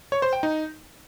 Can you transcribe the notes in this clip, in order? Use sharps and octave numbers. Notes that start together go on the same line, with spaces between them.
C#5
C5
G5
D#4